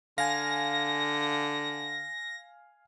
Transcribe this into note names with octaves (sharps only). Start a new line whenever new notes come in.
D3 F5 G#5 A#6